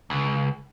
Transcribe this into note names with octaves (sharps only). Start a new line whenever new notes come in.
C#2